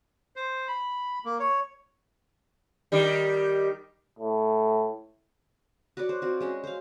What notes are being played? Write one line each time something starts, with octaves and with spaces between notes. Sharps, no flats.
C5
B5
A#3
C#5
D#3 G3
A2
F#4 B4 C#5 D5
C5
C4 F4 F#4
G#3 C#4 F#4
C5 F5